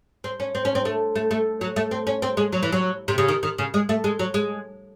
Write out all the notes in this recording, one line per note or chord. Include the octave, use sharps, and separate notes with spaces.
C4
C#4
C4
C#4
C4
A3
A3
A3
F#3
A3
C4
C#4
C4
G#3
F#3
E3
F#3
C3
C#3
D#3
D#3
C#3
G#3
A3
G#3
F#3
G#3